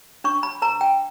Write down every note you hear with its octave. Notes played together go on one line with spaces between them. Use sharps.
D4 C#6
B5
B4 A#5
G5